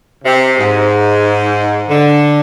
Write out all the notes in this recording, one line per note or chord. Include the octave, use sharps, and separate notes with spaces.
C3
G#2
D3